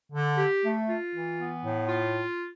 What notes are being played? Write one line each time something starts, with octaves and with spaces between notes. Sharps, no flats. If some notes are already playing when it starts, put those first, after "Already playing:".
D3
G4
A3
F4
E3
B3
A2
F4